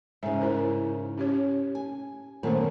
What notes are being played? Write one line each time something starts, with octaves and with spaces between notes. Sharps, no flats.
G#2 C#3 E5
E4 A#4 C5
C#4 G4 C#5
G#5
F#2 A#2 D#3 A3 B3 C5